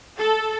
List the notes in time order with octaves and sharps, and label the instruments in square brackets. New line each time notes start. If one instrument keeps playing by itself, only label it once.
[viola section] A4